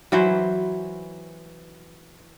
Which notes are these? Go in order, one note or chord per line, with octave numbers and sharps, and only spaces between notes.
E3 F#3 E4 C5